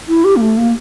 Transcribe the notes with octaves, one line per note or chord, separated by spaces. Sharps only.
E4
G4
A#3
A3
A#3